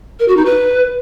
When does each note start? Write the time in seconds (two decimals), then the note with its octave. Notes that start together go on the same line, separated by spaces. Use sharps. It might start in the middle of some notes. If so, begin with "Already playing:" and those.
0.20 A#4
0.28 F#4
0.37 D#4
0.45 B4